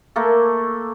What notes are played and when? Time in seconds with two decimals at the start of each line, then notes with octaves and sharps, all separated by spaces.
0.16 A3 A#3 A4